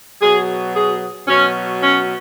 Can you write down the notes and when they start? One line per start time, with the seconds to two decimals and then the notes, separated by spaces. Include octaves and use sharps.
0.21 B2 F#3 G#4
0.75 G#4
1.28 B2 F#3 C#4
1.81 C#4